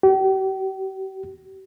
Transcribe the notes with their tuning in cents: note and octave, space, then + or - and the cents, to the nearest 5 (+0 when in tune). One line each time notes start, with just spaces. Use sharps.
G4 -40